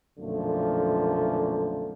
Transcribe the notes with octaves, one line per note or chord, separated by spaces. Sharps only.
B1 F#2 A#2 D3 F3 A3